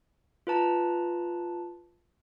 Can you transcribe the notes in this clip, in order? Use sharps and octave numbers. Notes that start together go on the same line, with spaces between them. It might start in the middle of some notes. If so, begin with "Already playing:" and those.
F4 B4 A5 A#5